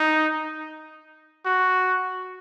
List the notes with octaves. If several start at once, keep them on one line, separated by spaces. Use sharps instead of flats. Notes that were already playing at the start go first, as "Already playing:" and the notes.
Already playing: D#4
F#4